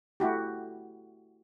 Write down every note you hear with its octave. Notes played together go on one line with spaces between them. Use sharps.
A3 E4 F#4 G4